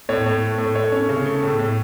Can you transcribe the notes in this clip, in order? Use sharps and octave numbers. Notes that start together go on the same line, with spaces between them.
A2 C#5
A2
A3
A2
A3 C#5
C#4
C#3
A3
A2
A2